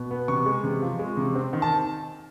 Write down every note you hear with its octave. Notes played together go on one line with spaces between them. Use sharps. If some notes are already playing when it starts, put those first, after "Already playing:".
Already playing: B2
B3
C3 C#6
G#3
C3
F3
G#3
C3
C4
D#3
A5